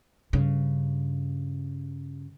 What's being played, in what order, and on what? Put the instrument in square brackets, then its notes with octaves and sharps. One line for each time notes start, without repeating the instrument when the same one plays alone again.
[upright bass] G2 C#3